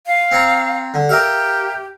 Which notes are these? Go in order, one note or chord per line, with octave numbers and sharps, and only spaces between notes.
F5
C4 C#5 A#5
D3
G4 A#4 E5 F5